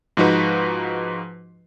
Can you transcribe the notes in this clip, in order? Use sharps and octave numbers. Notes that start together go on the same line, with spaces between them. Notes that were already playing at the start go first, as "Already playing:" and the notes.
G#2 F3 D#4 F#4 B4